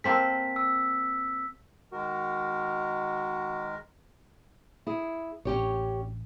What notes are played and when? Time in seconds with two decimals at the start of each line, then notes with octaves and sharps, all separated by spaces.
0.04 A#3 C4 A4 B6
0.56 E6
1.92 D#3 G#3 F#4 A#4
4.87 E4 G#4
5.45 A1 C#4 G4 C#5